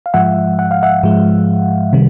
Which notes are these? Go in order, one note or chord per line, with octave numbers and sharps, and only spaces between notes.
F5
G#2 F3 G#3 E5 F#5
F#5
F5
E5 F#5
G#2 F3 G#3
C3 D#3 G3